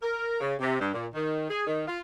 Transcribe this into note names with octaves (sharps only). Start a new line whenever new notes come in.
A#4
C#3
C3
G2
A#2
D#3
G#4
D#3
F4